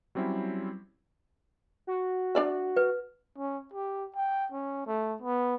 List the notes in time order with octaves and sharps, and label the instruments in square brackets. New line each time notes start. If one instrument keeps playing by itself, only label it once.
[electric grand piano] F#3 G3 C4 C#4 E4
[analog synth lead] F#4
[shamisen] D4 D5 E5
[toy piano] B4
[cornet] C#4
G4
G5
C#4
A3
B3